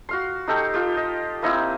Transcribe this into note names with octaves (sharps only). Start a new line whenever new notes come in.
F#4 F5 C6
D#4 G4 A4 G5
F4 G4
D#5
A#3 C4 D#4 E4